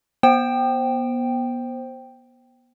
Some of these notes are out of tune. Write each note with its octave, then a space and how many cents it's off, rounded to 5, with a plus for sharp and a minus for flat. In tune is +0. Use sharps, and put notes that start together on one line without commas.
B3 -30 C5 +10 G5 +0